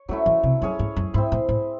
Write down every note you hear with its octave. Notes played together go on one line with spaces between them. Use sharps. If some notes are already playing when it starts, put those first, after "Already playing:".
Already playing: C#5
F#3 G#3 A3 C#4 E4
E3
C3
F#2 C#4 G#4 C#5
G#2
F#2
G#2 C4 E4 C5
A2
A2